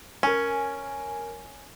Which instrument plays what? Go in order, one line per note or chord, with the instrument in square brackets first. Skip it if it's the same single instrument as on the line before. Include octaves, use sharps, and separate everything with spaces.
[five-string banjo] C#4 [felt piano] A#4 G#5